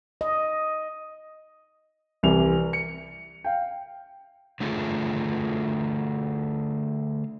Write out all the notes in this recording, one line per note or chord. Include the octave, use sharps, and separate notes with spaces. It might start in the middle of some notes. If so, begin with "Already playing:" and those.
D#5
C2 E3 G3 F7
C#7
F5 G5
D3 A3 F4 G#4